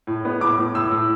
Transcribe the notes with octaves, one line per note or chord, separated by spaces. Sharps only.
A2
B3
A2 D6
A2
A2 E6
A2